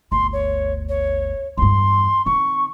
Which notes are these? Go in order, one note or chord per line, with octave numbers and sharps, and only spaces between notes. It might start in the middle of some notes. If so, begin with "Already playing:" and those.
G1 D2 C6
C#5
C#5
E2 G2 C6
D#3 C4 C#6